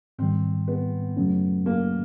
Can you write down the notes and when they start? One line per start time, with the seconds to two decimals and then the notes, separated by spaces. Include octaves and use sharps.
0.19 G#2 D#3 G3 C4
0.68 B3
1.17 F#2 C#3 F#3 A3 C#4
1.66 A#3